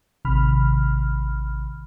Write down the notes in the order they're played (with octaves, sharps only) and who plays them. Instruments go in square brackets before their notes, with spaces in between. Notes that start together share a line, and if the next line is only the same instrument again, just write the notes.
[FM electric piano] A1 C3 D#3 B5 F6